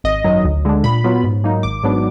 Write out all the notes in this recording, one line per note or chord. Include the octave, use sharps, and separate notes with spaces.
G#1 D#5
F#2 D#3 F#3
D2
D3 G#3 D4
A#2 B5
F#3 B3 F4
G#2
F#3 A#3 D#4
G#1 D6
G#2 F#3 B3 D4